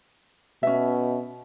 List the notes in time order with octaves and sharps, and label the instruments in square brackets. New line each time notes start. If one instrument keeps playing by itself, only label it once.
[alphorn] B2 [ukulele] C#4 E5